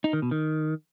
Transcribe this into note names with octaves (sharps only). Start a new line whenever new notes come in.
D#4
D#3
B2
D#3